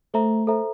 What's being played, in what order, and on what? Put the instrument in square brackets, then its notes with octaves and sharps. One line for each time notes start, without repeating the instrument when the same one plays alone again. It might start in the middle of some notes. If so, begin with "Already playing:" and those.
[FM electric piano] A3 [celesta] A4 C5 E5 A#5
[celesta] A4 C5 E5 A#5